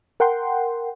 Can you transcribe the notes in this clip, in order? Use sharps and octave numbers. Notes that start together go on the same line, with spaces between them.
A#4 F#5 G5 C6